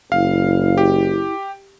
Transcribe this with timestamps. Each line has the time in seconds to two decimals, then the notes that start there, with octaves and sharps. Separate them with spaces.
0.12 F#1 E4 F5
0.78 G4